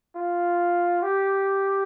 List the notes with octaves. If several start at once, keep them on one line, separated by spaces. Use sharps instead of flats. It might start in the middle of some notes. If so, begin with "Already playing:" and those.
F4
G4